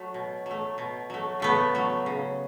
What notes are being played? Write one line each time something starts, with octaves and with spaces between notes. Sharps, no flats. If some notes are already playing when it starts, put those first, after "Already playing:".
Already playing: F#3 A3
B2
F#3 A3
B2
F#3 A3
C#3 A3 B3
F#3 A3
C#3